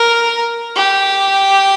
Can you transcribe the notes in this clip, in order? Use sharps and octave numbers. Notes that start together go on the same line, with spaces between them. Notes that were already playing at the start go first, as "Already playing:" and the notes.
Already playing: A#4
G4